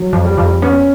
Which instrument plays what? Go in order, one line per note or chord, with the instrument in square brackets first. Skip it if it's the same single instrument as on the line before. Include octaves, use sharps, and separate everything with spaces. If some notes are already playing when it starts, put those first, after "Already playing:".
Already playing: [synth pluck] F#3
F2
[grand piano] G3
[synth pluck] F2
[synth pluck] B3 [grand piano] C#4